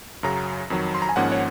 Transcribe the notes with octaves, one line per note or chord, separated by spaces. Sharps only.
F#2 C#3 F#3 A#5
F2 D#3 F#3
C6
A#5
G#5
G#1 G#2 F3 A#3 C#4 F#5
C#5